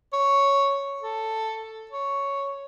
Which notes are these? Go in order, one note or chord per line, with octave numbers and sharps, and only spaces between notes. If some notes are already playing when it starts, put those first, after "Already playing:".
C#5
A4
C#5